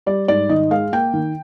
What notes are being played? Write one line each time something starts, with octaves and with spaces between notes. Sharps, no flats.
G3 D5
G#2 D5
D#3 D#5
G#3 F5
A#3 G5
D#3